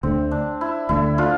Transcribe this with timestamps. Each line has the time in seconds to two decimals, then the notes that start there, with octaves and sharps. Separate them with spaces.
0.03 D2 D3 A3 C4
0.31 D4
0.61 E4
0.89 D2 D3 A3 E4
1.18 D4 F4